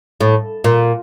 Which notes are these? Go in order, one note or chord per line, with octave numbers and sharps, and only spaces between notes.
A2
A#2